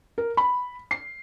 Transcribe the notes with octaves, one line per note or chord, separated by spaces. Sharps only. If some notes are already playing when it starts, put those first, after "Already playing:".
A#4
B5
C7